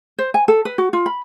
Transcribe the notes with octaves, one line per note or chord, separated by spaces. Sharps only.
C5
G#5
A4
B4
F#4
F4
B5